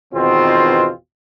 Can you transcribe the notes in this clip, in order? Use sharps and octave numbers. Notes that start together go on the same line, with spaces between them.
G#1 E2 B2 D#3 C4 F4